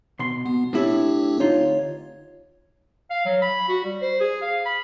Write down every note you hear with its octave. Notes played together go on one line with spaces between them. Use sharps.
B2 C6
B2 B3
A2 C4 D4 E4 G4 C#5
D2 D#4 F4 C#5
F5
F#3
B5
F#4
G3
C5
G#4
F5
B5